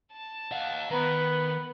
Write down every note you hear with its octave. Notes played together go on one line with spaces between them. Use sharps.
A5
D#5 F5 F#5
D#3 B3 B4 A#5